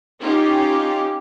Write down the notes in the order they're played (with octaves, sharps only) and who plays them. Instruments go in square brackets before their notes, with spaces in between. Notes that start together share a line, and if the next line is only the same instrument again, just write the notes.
[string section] C#4 D#4 F4 G4